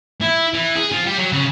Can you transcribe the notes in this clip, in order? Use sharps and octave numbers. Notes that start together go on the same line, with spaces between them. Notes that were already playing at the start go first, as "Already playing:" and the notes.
E4
E3
G#4
F3
G3
F#3
C#3